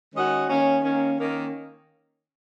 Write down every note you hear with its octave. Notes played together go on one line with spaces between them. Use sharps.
D#3 G#3 C#4 F#4 D#5
D#3 A#3 C#4
D#3 A#3 C#4
D#3 A#3 C#4